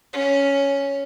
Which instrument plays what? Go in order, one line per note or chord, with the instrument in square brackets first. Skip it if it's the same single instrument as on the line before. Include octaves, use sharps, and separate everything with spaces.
[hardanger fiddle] C#4